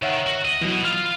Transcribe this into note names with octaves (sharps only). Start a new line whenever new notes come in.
D#3 C#5 E5 F#5
F#4
D2 D#5
B2 E3 F#3
F4 F6